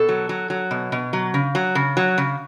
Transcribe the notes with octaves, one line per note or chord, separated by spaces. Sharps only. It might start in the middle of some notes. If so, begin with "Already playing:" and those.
Already playing: B2 A4
F#3
F#3
F#3
B2
B2
F#3
C#3
F#3
C#3
F#3
C#3